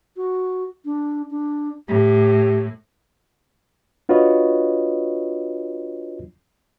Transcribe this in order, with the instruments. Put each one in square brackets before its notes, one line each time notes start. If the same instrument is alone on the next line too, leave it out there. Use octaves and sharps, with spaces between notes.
[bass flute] F#4
D4
D4
[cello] A2 [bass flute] G4
[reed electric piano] D4 F4 F#4 B4 C#5 D#5